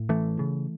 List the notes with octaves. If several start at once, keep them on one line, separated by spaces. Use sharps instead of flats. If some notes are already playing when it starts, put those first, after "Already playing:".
Already playing: A2
A1 E3 A3
C#3